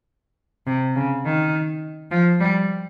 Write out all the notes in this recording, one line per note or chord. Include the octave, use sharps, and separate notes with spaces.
C3
C#3
D#3
F3
G3